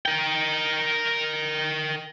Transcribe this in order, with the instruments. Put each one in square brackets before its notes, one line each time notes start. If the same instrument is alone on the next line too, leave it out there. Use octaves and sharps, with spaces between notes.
[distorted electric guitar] A#4 G5